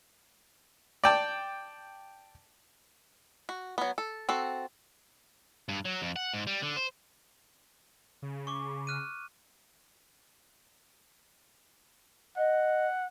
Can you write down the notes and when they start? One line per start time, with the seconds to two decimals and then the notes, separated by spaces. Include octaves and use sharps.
1.04 D5 G5 A5
3.49 F#4
3.78 F#3 B3
3.98 A4
4.29 C4 F#4 A4
5.69 G2
5.85 F#3
6.02 F2
6.16 F#5
6.33 G#2
6.47 G3
6.62 D3
6.76 C5
8.22 C#3
8.47 C#6 D6
8.87 F6 F#6 D#7
12.37 D#5 F#5